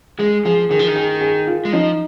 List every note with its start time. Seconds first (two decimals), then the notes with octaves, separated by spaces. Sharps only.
0.19 G#3 G#4
0.45 F3 G#4
0.70 D#3 G#4
0.79 F3
0.88 D#3
0.95 G#4
1.21 G#4
1.47 F4
1.65 G#3
1.73 F3 D#4